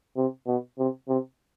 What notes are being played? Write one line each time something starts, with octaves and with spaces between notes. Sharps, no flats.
C3
B2
C3
C3